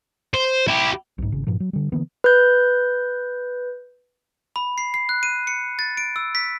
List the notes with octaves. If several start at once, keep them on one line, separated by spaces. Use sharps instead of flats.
C5
E4 G4
B1 G#2
G#1 C#3
G2 A#2 F3
F#3
D3 G3
D3 E3 A#3 B3
B4 G6
B5
C7
C7
F#6
D#7
C#7
A6
D7
E6
B6